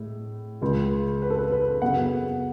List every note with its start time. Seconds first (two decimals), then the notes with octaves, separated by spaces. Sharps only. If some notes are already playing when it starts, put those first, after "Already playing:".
Already playing: A2 G#3
0.61 C#2 C#3 G#3
1.22 B4
1.30 A4
1.39 B4
1.52 B4
1.81 F#2 C#3 F#3 B3 F#5